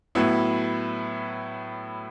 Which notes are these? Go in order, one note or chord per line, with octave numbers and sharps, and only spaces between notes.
A2 F#3 B3 E4